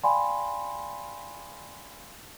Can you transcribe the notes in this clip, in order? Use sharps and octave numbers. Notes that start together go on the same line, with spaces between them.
D5 F5 G5 G#5 B5 C6